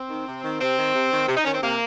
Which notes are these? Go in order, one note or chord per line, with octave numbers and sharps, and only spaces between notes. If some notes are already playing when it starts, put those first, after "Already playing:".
Already playing: C4
D#3
C3
D#3
C3 C4
D#3
C3
D#3
C3
D#4
D#3 C#4
C4
C3 A#3